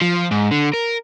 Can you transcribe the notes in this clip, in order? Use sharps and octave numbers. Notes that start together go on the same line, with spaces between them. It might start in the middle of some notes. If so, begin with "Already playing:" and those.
F3
G#2
D3
A#4